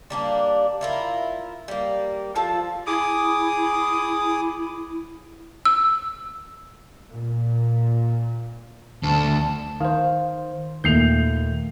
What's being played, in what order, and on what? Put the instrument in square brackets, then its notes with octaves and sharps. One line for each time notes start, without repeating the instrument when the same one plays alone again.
[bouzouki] G3 A#3 D4
E4 F4 A#4
G3 A#3
F3 F4 A4 A5
[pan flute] E4 [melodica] G#4 D6 D#6
[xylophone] E6
[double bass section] A#2
[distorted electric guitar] D2 [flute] A5
[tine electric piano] D#3 C5 [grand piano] F5
[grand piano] D#2 C7 F7 [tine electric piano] A#2 A3 G6